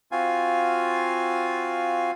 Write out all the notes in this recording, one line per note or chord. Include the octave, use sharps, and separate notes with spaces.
C4 F4 F#4 F5 G#5